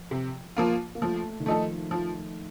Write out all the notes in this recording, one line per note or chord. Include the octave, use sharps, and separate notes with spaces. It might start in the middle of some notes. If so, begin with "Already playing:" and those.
Already playing: F3
C3
F3 A#3 F4
A#3
F3 A3
D#3
F3 A3 D#4 A4
F3